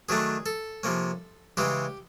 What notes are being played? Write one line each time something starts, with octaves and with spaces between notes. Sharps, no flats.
D#3 F#3 A3 D4 G#4
A4
C3 F3 A#3 C#4
C#3 E3 G#3 C#4 G4